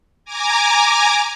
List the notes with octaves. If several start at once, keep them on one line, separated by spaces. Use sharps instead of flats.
G#5 A#5 D6